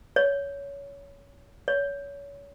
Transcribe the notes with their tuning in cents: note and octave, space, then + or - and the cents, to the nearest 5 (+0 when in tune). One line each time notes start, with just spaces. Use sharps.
C#5 +20
C#5 +30